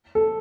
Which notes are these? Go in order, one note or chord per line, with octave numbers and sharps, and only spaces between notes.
A4